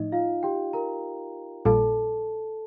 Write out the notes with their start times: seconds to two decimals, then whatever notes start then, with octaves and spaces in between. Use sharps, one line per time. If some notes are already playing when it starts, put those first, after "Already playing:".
Already playing: A2 F3 A3 D#4 D#5
0.12 F4 F5
0.43 G4 G5
0.73 A#4 A#5
1.65 A#1 A#2 G3 A#3 A4 A5